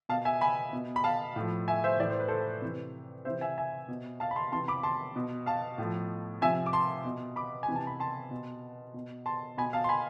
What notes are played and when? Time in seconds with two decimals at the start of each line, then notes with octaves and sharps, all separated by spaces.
0.09 B2 F5 A5
0.25 E5 G#5
0.41 G#5 B5
0.73 B2
0.96 B5
1.04 F5 A5
1.36 A2 F3
1.68 E5 G#5
1.84 C5 E5
1.99 A2 E3 D5
2.10 C5
2.20 B4
2.28 A4 C5
2.62 C3 E3
3.25 C3 E3 C5 E5
3.41 E5 G#5
3.58 E5 G#5
3.88 B2
4.20 F5 A5
4.31 B5
4.36 A5 C6
4.52 C3 E3 A5 C6
4.68 B5 D6
4.83 A5 C6
5.16 B2
5.46 F5 A5
5.78 A2 F3
6.41 C3 F3 E5 G#5
6.66 D6
6.73 A5 C6
7.05 B2
7.36 B5 D6
7.63 G#5
7.68 C3 E3
7.76 A5
7.87 B5
8.00 A5 C6
8.31 B2
8.94 B2
9.26 A5 C6
9.58 B2 G#5 B5
9.73 F5 A5
9.84 C6
9.89 G#5 B5